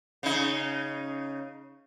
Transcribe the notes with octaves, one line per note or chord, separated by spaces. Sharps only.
C#3 D#4